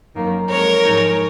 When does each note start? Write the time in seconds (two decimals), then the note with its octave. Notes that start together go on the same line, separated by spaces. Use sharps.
0.15 F#2 D#3 A#3
0.49 F2 F3 G#3 A#4 C#5
0.83 G#2 F3 G#3 D#4